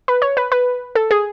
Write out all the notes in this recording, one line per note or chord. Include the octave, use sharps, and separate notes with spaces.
B4
C#5
B4
B4
A4
G#4